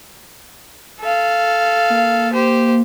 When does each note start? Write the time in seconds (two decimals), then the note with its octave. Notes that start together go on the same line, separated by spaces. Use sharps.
1.01 A4 F5
1.90 A#3
2.33 G4 C5